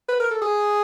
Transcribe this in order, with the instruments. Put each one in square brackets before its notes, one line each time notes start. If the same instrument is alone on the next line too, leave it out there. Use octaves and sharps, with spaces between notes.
[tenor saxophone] B4
A#4
A4
G#4